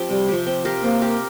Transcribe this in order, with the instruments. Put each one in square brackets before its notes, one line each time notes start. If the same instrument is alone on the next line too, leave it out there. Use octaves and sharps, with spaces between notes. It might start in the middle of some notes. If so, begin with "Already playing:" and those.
Already playing: [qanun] F3 C4 G4
[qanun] C3 [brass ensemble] G3
[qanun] F3 C4 G4
C4
G4 A#4 F5
[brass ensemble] A#3 [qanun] C4
[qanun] G4 A#4 F5